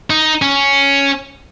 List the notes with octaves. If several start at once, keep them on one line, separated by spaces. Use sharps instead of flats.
D#4
C#4